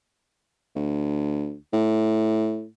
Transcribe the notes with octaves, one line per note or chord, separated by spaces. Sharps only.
D2
A2